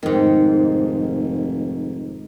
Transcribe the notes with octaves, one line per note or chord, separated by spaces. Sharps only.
F1 G#2 D#3